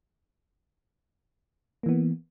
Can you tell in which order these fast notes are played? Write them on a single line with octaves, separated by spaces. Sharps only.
A#3 E3 B3